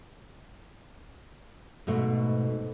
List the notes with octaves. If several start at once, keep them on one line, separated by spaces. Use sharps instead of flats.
G#2 B2 A3